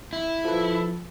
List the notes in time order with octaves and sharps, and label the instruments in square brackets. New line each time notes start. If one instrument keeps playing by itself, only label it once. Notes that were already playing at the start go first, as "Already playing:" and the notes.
[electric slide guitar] E4
[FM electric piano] F3 B4 [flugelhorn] A4